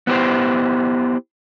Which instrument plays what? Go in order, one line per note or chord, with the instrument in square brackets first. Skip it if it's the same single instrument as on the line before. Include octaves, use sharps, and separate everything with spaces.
[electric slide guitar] B3 E4 G4 C5